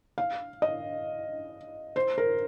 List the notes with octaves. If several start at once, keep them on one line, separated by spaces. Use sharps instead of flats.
F5
D#5
C5
A#4